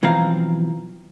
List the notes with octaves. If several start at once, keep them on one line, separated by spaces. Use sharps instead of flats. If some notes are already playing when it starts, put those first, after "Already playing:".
B1 E3 F3 C4 F5 A#5